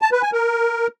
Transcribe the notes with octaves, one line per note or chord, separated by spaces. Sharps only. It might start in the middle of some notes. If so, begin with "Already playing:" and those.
A5
B4
G#5
A#4